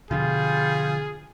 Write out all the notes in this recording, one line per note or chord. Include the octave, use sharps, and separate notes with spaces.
B2 D3 F3 G3 F4 G#4